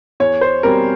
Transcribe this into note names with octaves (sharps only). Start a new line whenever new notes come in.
E2 C#5
C5
B2 G3 C4 A#4